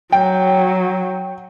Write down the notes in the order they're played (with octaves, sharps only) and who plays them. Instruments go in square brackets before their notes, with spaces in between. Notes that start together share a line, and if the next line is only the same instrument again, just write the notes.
[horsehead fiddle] F#3 [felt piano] G5